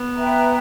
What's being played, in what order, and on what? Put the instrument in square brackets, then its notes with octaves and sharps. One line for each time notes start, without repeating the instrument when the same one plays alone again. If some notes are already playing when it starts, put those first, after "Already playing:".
Already playing: [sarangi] B3
[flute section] B4 E5 G5 A#5